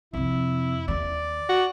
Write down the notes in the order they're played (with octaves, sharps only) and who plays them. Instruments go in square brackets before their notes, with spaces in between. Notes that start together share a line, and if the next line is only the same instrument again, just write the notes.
[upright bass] F2 C3 [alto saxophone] E4
[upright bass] D#2 A#3 [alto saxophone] D5
[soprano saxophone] F#4